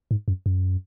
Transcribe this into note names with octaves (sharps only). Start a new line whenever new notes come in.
G#2
F#2
F#2